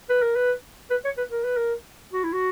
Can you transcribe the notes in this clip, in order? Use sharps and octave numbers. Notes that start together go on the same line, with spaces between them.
B4
A#4
B4
B4
C#5
B4
A#4
B4
A#4
F#4
E4
F#4